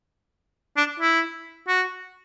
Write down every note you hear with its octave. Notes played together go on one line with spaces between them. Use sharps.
D4
E4
F#4